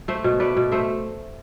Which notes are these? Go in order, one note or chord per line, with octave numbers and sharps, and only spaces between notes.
A3 C5 E5
B2
A3 B4 D5
B2
A3 C5 E5